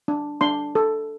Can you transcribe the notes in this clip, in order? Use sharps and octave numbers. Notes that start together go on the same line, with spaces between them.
D4
D4 C6
A4